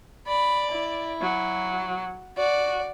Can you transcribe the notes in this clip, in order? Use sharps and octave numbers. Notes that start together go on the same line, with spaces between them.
D5 B5
E4
F#3
F#4 D5